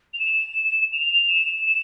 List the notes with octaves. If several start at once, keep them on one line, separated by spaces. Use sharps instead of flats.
F7
E7
F7
E7
E7